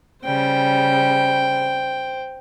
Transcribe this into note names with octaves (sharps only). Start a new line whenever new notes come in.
C#3 G3 C5 G5